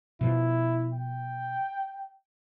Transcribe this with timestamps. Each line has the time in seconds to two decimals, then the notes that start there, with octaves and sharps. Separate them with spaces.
0.21 B2 F3 E4
0.94 G5